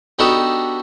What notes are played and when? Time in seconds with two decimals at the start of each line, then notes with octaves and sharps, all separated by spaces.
0.19 B3 D4 D#4 F#4 G4 A4